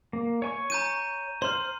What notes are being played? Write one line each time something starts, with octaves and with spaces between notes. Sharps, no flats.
A#3
C#5 G#5 C#6
A#5 G6 D#7
C5 C6 F6